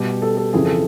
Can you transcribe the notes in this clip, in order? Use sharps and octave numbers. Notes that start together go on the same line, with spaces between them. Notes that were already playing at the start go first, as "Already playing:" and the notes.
Already playing: B2 G3 G4
A4
A4
F2 C#3 E3 G#4
A4